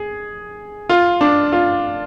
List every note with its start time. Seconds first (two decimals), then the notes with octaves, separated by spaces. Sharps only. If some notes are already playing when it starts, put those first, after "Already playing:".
Already playing: G#4
0.89 F4
1.21 D4
1.53 F4